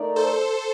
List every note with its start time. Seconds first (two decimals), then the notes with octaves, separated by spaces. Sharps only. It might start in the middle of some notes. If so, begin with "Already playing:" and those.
Already playing: A3 D#4 A#4 D5
0.16 A4 C5